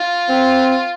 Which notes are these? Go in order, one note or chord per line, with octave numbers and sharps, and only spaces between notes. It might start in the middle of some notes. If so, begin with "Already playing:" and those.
Already playing: F4
C4